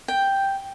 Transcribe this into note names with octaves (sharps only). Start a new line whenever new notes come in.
G5